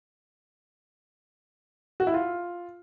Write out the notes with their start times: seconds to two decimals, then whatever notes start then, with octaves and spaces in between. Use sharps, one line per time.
2.00 F#4
2.07 E4
2.14 F4